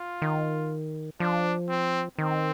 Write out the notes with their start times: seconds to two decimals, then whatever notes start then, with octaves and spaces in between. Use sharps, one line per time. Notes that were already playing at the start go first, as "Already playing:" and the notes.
Already playing: F4
0.22 D#3
1.20 F3 D4
1.69 C4
2.18 D#3 C4